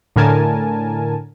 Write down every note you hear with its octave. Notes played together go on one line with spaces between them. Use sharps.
A2 D3 A#4 G#5 A5